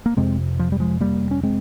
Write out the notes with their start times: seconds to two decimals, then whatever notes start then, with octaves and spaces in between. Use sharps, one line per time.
0.06 A#3
0.17 F2 C3 G#3 C4
0.59 F3
0.72 G3
0.80 F3 G#3
1.00 G3 A#3
1.31 C#4
1.43 G#3 C4